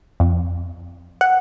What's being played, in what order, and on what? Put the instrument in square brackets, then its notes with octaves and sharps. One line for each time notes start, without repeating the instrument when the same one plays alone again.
[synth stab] F2
F#5